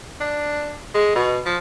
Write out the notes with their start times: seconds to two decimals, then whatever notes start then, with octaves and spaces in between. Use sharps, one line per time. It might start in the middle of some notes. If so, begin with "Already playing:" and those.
0.20 D4
0.94 G#3
1.15 B2
1.46 F3